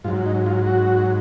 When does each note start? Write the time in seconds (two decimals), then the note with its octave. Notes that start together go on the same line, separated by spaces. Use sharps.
0.04 G#2 F4
0.08 F#3
0.26 D#4
0.46 F4
0.67 F#4